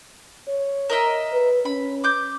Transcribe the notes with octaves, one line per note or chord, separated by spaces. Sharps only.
C#5
A#4 D#5 E5
B4
C#4 B5
D6 G6